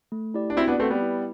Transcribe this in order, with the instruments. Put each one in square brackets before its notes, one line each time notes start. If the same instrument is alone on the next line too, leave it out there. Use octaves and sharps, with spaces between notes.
[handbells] A3
E4 G4 D5
[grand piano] D4
[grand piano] C4 E4 [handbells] F#4
[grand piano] B3 D4
[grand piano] A3 C4 [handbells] B4
[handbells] F#5
[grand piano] G3 B3
[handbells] E4